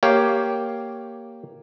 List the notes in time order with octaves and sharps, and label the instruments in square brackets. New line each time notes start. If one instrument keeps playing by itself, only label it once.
[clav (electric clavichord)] A#3 G4 C#5 F5